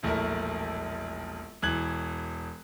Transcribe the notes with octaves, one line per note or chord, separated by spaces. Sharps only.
E1 A#1 A3 E4 A#4
E1 E3 F#6 G#6 F#7